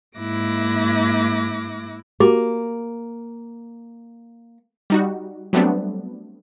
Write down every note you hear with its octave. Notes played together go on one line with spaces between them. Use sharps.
G#2 A#3 E4 D6 F#6 A#6
A#3 F#4 G4
G3 D#4 F#4
F#3 G3 A3 B3 C4 D4